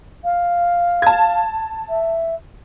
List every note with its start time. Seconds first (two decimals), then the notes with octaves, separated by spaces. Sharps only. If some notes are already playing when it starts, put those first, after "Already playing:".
0.24 F5
1.02 A5 G#6
1.89 E5